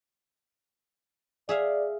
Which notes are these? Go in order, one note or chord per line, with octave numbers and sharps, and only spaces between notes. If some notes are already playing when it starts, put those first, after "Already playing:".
G#4 D5 E5 F5